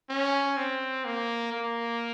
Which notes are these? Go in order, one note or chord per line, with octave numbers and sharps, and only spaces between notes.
C#4
C4
A#3
A#3